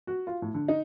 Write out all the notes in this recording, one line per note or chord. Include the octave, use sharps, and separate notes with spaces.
F#4
F4
A2
D3
D#4